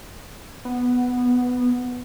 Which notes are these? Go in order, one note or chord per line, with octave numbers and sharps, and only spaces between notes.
B3